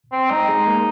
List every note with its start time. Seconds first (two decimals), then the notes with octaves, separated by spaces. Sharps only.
0.12 C4
0.31 G#3 D#4
0.49 G#3
0.67 A#3